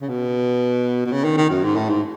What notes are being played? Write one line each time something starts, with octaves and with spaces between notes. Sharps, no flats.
C#3
B2
B2
C#3
D#3
D#3
F#2
G#2
A2
G#2